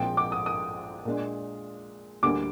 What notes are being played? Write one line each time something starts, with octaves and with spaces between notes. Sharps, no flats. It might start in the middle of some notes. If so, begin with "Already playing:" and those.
Already playing: A#1 A#2 F3 G#3 C4 G5
D6
D#6
D#6
A#2 G#3 D4
D2 D3 G3 A#3 D6